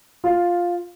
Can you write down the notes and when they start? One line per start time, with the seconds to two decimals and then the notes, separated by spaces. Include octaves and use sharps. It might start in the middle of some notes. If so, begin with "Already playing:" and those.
0.24 F4